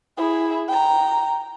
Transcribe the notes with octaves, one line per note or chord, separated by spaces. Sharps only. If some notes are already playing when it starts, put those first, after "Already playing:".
E4 G#4
G5 A#5